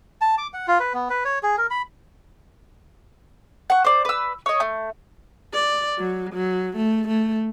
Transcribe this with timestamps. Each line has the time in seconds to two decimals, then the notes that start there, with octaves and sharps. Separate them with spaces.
0.21 A5
0.38 D6
0.53 F#5
0.68 F4
0.80 B4
0.94 B3
1.10 B4
1.25 C#5
1.43 G#4
1.58 A#4
1.70 B5
3.70 F#5 C#6
3.85 C5 D5
4.05 B4 E6
4.46 C#5 D#5
4.60 A3
5.53 D5
5.99 F#3
6.33 F#3
6.77 A3
7.08 A3